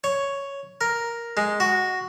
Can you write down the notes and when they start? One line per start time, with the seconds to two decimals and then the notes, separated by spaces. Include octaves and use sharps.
0.04 C#5
0.81 A#4
1.37 G#3
1.60 F#4